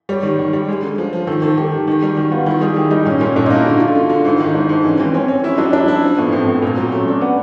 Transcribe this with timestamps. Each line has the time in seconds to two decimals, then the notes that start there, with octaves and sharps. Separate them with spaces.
0.09 G3 C#5
0.23 D#3
0.39 D#3
0.53 G3
0.68 G#3
0.83 D3
0.98 F3
1.13 F3
1.27 D#3 A4
1.42 D#3 A4
1.57 D#3 G4
1.72 D#3
1.87 D#3
2.02 G3
2.17 D#3 F#4
2.31 B3 F4
2.46 D#3 E4
2.61 G3 G#4
2.76 D#3 G4
2.91 G3 D#4
3.05 A#2 C#4
3.21 A#2 C#4
3.36 A#2 D4
3.46 D#4
3.50 A#3
3.56 E4
3.65 D3 F#4
3.80 D3 F4
3.95 D3
4.10 D3
4.25 G#2 E4
4.39 D#3 D#4
4.54 G#2 D4
4.69 G#2
4.84 E3 C#4
5.00 E3 C4
5.14 C4 C#4
5.28 C#4
5.43 C#4 E4
5.58 F#3 D4
5.73 D4 E4
5.88 E4
6.03 F3
6.18 A2 B3
6.32 A2 C4
6.48 A2
6.62 A#2
6.77 F#3
6.92 A3 C#4
7.08 D4
7.21 B3